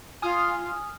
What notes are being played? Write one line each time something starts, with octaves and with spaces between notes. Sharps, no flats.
F4 G#5 D#6 F6